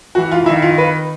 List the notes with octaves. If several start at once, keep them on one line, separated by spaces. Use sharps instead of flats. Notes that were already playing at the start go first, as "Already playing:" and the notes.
E3 F#4
F4
D#3 E4
F4
B4